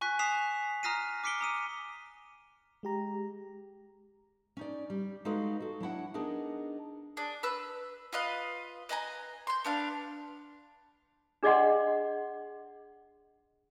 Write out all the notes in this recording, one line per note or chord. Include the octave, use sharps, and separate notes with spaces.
G#5 C#6 F#6 B6
G#5 D#6 B6 C7 E7 F7
A#5 D#6 F6 A#6 C7 D#7
D6 F6 B6 C#7 D7 G7
A#5 D#6 D#7
G#3 G4 A#5
C#4 D#4 D5
G3
G#3 D#4 F#4 A4 B4 F5
F#4 A4
F#3 D4 E4 F#5
B3 D4 D#4 G#4 A#4
D4 G#4
B4 E6
F4 B4 D#5 F5
B4 D#5 G#5 A#5
C6 G6
B3 D4 F5
D4 G#4 D5 D#5 F#5 C6